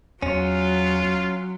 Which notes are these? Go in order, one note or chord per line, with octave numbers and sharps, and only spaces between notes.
E2 F#3 C#4 F4